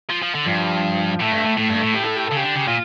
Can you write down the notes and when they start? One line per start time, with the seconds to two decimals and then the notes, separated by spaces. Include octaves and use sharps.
0.10 F3
0.23 F3
0.35 D3
0.46 G2 F3
1.20 A2 A3
1.32 G2
1.45 A2
1.57 A2 A3
1.70 G2
1.75 A3
1.81 A2
1.94 G4
2.05 A4
2.16 G4
2.27 C#3 A4
2.37 G4
2.43 D3
2.55 C#3
2.67 A#2 F4